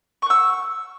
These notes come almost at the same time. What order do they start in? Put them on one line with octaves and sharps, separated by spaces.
C#6 F#5 E6